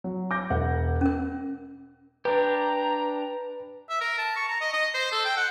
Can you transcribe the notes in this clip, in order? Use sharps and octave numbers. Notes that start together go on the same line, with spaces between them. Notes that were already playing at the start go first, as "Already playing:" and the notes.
F#3
D6 G6 A#6
E1 F#5
C#4 A#4
D4 G4 B4 A#5
E5
A#4
A5
C#6
A#5
D#5
D#5
C5
A4
G5
F#5